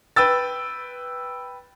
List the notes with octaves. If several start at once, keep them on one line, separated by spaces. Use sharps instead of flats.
B4 G5 E6 A6